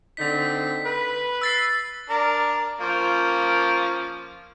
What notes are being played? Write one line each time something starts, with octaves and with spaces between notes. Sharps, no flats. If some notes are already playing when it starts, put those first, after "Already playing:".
D3 C4 D#4 B6
B4
E6 A6 C7
D4 A#4
F3 A#3 C#4